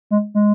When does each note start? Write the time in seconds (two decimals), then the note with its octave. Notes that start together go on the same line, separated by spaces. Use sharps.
0.11 G#3
0.34 G#3